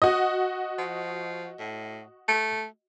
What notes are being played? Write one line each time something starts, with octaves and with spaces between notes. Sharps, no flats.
F#4 D#5
F3
A2
A3